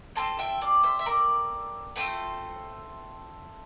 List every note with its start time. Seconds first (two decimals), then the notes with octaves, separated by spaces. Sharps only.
0.16 C4 F4 A4 A5 C6
0.39 E5 G5
0.61 D5 F5
0.83 C5 E5
0.99 E5
1.06 A#4 D5
1.96 A3 C4 F4 A4 C5